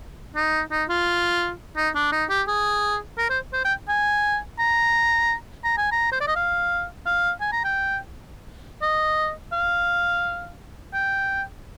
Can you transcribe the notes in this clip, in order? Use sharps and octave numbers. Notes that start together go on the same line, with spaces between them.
D#4
D#4
F4
D#4
D4
D#4
G4
G#4
A#4
C5
C5
G5
G#5
A#5
A#5
G#5
A#5
C5
D5
D#5
F5
F5
G#5
A#5
G5
D#5
F5
G5